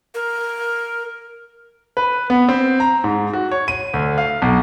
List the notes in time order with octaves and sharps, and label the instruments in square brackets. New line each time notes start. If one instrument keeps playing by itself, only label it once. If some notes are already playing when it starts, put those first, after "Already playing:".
[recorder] A#4
[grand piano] B4
B3
C4
A#5
G#2
F#4
C#5
D#7
D2
F5
B1